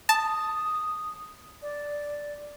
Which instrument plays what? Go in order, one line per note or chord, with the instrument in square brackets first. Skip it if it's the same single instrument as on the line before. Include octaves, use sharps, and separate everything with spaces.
[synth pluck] A5 [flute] D#6
[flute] D5